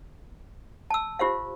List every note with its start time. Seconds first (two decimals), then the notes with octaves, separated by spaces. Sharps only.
0.90 A5 E6
1.19 F4 G4 C5 F5